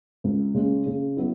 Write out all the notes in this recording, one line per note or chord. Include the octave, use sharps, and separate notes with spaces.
C#2
C#3 G#3 C#4
C#3
F#3 B3 E4